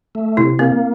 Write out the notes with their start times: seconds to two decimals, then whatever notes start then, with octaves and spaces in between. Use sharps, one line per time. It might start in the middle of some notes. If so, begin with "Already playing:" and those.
0.15 A3
0.37 C3 E4
0.59 A#3 C4